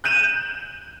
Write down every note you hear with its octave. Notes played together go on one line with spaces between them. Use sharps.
F#6 G6 D#7 E7 F#7